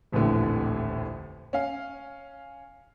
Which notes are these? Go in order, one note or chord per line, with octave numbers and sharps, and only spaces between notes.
D#1 A1 F2 A2 D3
C#4 F5